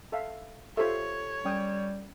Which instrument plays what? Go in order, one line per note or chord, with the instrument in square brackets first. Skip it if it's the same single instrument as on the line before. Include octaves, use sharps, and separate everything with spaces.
[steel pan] A4 E5 F5
[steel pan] F4 C5 E5 [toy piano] G4 A4 [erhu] C#5
[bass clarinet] G3 [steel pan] C#4 G5 D#6